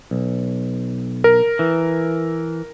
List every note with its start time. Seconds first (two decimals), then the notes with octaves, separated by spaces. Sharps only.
0.11 B1
1.24 A#4
1.59 E3